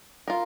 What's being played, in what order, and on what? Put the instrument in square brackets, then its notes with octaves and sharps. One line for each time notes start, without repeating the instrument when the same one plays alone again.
[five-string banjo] F4 A#4